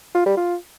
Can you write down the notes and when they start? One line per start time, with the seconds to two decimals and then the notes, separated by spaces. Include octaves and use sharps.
0.15 F4
0.26 G3
0.37 F4